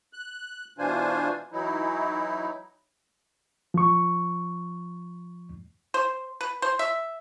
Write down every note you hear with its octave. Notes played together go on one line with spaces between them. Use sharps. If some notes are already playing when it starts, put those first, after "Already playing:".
F#6
B2 E3 D4 F4 C5 G#5
E3 F#3 D#4 E4
F3 C#6
C5
B4
C5
E5